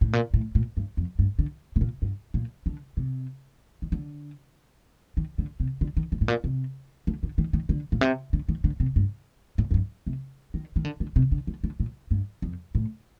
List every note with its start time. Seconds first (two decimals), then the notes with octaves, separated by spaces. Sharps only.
0.01 A2
0.13 A#2
0.34 A2
0.55 A#2
0.77 G2
0.97 F2
1.19 G2
1.39 D3
1.76 C3
1.81 A#2
2.02 G2
2.34 A#2
2.66 D3
2.97 C3
3.82 D#3
3.92 D3
5.17 D#3
5.38 D3
5.60 C3
5.81 D3
5.97 D#3
6.12 D3
6.21 A2
6.28 A#2
6.44 C3
7.07 D3
7.23 D3
7.38 D#3
7.53 D#3
7.69 D3
7.92 A#2
8.01 C3
8.33 D3
8.49 D#3
8.64 D3
8.80 C3
8.96 G2
9.58 A2
9.71 F2
9.74 G2
10.07 C3
10.54 D#3
10.76 D#3
10.85 D3
11.00 D3
11.16 C3
11.32 D3
11.47 D3
11.64 D3
11.80 A#2
12.11 G2
12.42 F2
12.75 A2